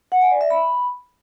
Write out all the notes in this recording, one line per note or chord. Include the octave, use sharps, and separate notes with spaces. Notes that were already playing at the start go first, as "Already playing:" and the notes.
F#5
G#5
D5
E5
B5